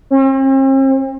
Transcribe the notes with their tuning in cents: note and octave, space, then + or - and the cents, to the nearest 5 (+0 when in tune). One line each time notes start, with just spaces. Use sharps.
C4 +45